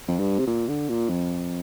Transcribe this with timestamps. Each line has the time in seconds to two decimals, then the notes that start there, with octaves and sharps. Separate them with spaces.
0.08 F2
0.20 G2
0.39 C3
0.47 A#2
0.68 D3
0.89 A#2
1.09 F2